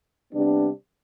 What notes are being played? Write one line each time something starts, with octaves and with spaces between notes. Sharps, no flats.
C3 G3 B3 D4